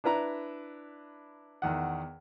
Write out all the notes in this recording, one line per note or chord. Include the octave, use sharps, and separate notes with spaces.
D4 E4 B4 A#5
E2 D#3 F#5